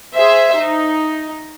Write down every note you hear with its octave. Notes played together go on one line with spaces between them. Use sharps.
G#4 C5 E5
D#4